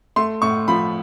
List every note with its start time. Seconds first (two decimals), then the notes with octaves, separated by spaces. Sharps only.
0.16 A3 C6
0.42 A2 C#6
0.68 F3 B5